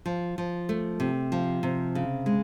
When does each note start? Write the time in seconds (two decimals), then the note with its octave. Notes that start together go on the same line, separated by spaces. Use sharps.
0.06 F3
0.38 F3
0.69 A3
1.00 C3
1.32 F3
1.63 C3
1.95 C#3
2.26 G#3